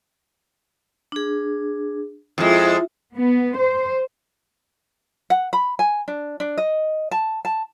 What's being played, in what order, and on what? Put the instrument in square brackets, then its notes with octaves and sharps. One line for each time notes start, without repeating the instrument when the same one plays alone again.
[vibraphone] D4 G#4
[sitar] F2 G#3 [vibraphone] E4 F4 E5
[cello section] B3
C5
[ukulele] F#5
B5
G#5
D4
D4
D#5
A5
A5